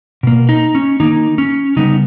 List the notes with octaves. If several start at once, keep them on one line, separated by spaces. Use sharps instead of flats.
B2 A#3
D#4
C#4
D#3 A#3 D#4
C#4
C#3 G3 B3 D#4